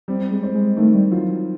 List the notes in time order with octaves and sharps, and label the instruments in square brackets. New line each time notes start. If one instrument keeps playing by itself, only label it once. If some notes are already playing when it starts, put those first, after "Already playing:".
[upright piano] G3 [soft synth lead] C4
[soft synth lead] G#3
[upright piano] C4
[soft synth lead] G#3
[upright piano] D#3 [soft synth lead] A3
[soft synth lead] G3
[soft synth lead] F#3 [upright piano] F4
[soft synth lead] F#3